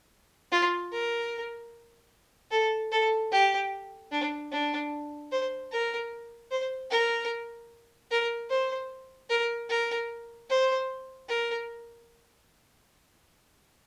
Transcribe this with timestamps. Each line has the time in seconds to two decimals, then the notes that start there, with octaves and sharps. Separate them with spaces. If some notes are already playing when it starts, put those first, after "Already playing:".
0.52 F4
0.92 A#4
2.51 A4
2.92 A4
3.32 G4
4.11 D4
4.52 D4
5.32 C5
5.72 A#4
6.51 C5
6.91 A#4
8.11 A#4
8.50 C5
9.30 A#4
9.70 A#4
10.50 C5
11.29 A#4